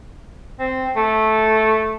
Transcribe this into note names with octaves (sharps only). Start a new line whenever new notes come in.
C4
A3